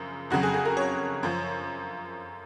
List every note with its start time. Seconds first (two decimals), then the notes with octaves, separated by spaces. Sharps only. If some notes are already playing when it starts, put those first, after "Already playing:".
Already playing: F#2 C#3 F3
0.30 F2 C#3 F#3 F#4
0.43 G#4
0.54 G#4
0.65 A#4
0.77 C#5
1.23 F#2 F3